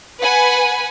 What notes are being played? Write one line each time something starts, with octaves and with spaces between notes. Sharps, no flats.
B4 F#5 G#5 B5